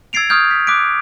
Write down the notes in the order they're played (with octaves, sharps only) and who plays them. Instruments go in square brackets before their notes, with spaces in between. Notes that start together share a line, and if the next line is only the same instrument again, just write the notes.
[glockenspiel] E6 G#6 A6 C7 D7 F7
C#6 D#6 F6 G6 G#6
B6
D6 F#6 B6 D7